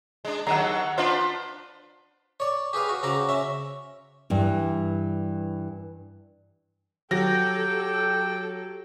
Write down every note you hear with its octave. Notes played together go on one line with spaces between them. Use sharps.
G#3 D4
D#2 D#3 F#3 F#5 A#5
D4 F4 B4 C5
C#5 D5
G4 G#4 B4 F5
F#4
C#3 C4 C#4 F#4 A#5 D6
C#4 E5
G2 E3
F#3 G4 A4 G5 A#6